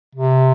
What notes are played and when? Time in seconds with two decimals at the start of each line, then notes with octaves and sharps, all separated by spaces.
0.15 C3